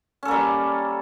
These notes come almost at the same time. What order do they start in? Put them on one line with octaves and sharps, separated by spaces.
C#4 A4 A#3 G3